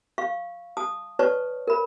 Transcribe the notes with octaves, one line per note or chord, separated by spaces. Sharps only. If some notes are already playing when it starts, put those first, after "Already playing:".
F5 C#6
A5 D#6
B4 C#5 D5 A5 C#6
A#4 B5